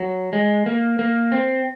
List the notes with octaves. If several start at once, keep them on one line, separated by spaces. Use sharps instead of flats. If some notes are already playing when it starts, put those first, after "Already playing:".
Already playing: F#3
G#3
A#3
A#3
C4